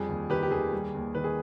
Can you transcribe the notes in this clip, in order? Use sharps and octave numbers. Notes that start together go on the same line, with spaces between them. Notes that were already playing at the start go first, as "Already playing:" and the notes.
Already playing: F2 G3 G#4
D#2
D#3 G4 B4
G4
D#2 G#4
G3
D#2
D#3 B4
G#4